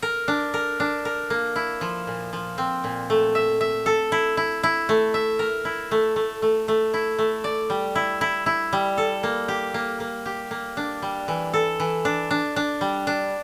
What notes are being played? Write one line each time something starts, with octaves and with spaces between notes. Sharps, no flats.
A#4
D4
A#4
D4
A#4
A#3
E4
F3
A#2
F3
C4
A#2
A3
E5
E5
A4
E4
E4
E4
A3
E5
A#4
E4
A3
A3
A3
A3
E4
A3
D5
G3
E4
E4
E4
G3
A4
A#3
G4
A#3
A#3
G4
A#3
D4
G3
E3
A4
E3
D4
D4
D4
G3
D4